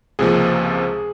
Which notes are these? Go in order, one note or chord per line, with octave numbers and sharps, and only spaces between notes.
C#2 C3 F3 A#3 G#4